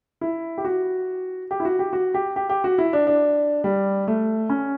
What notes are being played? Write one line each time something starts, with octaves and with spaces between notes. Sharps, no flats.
E4
G4
F#4
G4
E4
F#4
G4
F#4
G4
G4
G4
F#4
E4
D4
D4
G3
A3
C#4